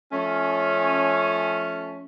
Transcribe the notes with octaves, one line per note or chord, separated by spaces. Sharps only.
F3 A3 C#4